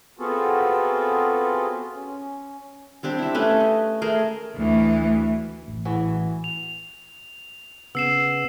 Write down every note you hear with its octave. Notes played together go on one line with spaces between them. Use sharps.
B3 C4 F4 F#4 G#4 A4
C#4
G3 C4 D4 G4
E4 E5
A3 C#4 B4
D#5
A3 G#4 A#4
D2 E3
A1
E3 F#4 G#4
F7
C#3 B3 E6 C7 E7